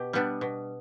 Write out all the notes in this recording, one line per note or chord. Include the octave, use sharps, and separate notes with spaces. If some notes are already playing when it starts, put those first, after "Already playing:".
Already playing: B2 G4
G3 B3 D4
B2